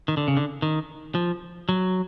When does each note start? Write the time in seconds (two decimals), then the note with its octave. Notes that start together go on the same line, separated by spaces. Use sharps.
0.08 D#3
0.17 D3
0.28 C#3
0.37 D3
0.62 D#3
1.15 F3
1.69 F#3